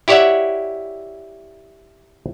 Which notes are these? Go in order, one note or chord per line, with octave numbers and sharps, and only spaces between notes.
E4 G4 C#5 D5 E5 F#5